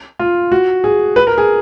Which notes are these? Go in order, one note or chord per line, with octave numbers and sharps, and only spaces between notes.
F4
F#4
G#4
B4
A#4
G#4